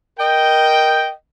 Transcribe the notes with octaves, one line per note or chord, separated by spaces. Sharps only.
A#4 D#5 G5